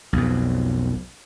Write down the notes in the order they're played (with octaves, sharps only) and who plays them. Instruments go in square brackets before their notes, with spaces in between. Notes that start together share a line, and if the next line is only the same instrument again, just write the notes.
[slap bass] B1 F2